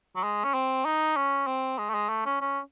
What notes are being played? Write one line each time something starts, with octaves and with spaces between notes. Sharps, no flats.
F#3
G#3
C#4
C4
D#4
C#4
C4
G#3
A3
G#3
A3
C#4
C#4